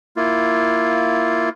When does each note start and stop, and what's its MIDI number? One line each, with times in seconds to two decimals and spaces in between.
0.17 1.49 58
0.17 1.49 64
0.17 1.49 65